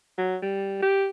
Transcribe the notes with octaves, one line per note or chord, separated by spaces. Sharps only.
F#3
G3
G4